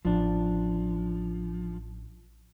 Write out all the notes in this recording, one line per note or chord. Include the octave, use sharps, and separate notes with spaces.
A1 F3 D4